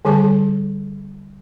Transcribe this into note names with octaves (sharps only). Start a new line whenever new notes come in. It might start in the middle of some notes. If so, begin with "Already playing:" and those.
D3 G3 G#4 A5